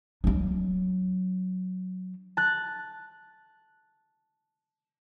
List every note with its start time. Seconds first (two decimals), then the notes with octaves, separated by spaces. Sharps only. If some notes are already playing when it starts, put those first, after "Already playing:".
0.24 F#3 D4
2.37 A5 F#6